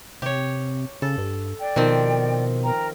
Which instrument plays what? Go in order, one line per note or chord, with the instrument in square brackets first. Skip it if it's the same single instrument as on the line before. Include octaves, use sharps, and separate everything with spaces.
[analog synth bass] C3 [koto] G4 C#5
[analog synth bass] C#3 [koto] A4
[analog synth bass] G2
[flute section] D5 G5
[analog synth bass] B2 [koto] D#3 F3 C4
[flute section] A#4 G5 A#5